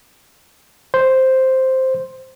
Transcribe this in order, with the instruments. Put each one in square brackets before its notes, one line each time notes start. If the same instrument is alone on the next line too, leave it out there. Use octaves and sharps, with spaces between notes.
[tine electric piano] C5